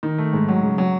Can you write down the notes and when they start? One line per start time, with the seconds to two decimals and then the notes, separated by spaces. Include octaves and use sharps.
0.03 D#3
0.18 A3
0.33 G#2
0.48 F#3
0.63 C#3
0.78 F#3